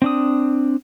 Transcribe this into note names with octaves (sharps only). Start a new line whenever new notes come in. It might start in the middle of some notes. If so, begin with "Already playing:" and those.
C4 D4 D#6